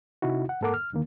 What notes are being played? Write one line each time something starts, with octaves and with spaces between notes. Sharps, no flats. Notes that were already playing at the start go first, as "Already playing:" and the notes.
C3 D#4 E4 F#4
F#5
G#2 A#3 A4 A#4 F#5 D6
F6
D#2 D3 D#3 A#3